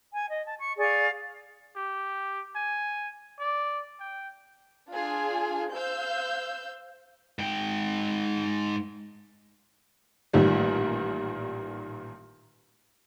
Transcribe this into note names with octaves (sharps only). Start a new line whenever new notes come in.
G#5
D#5
A5
C#6
G#4 D5 F5 C#6
G4
G#5
D5
G5
D4 F4 G#4 G#5
C5 F5 E6 G6
G#2 G5
A1 A#2 D#3 G3